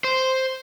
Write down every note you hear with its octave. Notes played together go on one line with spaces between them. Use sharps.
C5